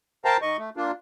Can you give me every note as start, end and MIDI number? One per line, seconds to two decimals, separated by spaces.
0.25 0.37 70
0.25 0.37 72
0.25 0.37 77
0.25 0.37 79
0.25 0.37 81
0.25 0.37 82
0.42 0.57 51
0.42 0.57 75
0.42 0.57 85
0.58 0.70 57
0.77 0.91 58
0.77 0.91 62
0.77 0.91 65